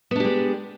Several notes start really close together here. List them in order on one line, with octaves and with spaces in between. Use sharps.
B3 D4 G4 G#3